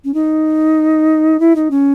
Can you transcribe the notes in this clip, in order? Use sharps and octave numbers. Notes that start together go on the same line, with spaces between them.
C#4
D#4
E4
D#4
C#4